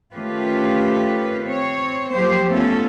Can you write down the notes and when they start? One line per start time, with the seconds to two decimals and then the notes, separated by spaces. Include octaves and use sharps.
0.14 D#3 A3 C#4 F4 G4 B4
1.43 C4 C#5
2.13 F3 F#3 A#3 G4 C5
2.50 A3 B3 C#4 F4 A4